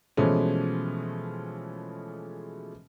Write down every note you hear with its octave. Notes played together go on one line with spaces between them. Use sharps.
B2 E3 F3 G#3 A3 C#4